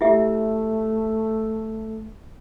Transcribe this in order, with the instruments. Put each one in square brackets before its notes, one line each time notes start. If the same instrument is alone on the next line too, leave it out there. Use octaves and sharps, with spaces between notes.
[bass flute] A3 [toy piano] E4 G4 E5